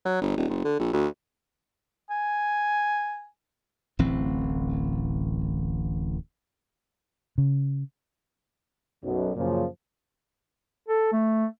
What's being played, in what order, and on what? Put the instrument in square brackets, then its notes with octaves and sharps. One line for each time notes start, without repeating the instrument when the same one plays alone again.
[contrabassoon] F#3
G1
D#1
F#1
D3
A#1
D2
[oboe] G#5
[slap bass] D1 A1 E3 C4
[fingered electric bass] C#3
[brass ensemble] B1 F#2 B2
F#2 A#2 C#3 F3
[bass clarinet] A4
A3